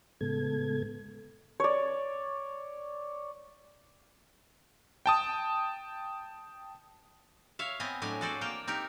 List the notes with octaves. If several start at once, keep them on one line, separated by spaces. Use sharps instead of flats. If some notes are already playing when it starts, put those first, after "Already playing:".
A2 C#3 G#3 B3 A4 G#6
C#5 D5
G5 A5 D#6
C#5 E5 F5
B3 C4 D#5 G#5
A2 F#3 D4 D#5 G#5
F#4 G#4 A4 C5 D5
A#3 A#4 C5 G5
C4 D#4 G4 A#4